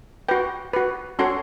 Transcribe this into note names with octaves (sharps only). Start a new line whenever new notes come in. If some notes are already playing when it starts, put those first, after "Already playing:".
F#4 B4 G5
F#4 B4
C#4 F#4 A4 C#5 C6